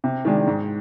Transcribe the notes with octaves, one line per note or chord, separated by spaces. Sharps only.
C3
D#3 G#3 D4
G#2